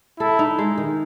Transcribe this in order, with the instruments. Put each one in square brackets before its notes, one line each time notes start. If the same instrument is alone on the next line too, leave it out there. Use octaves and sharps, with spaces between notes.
[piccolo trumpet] E4 [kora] A4
[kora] D#4
G#3
D#3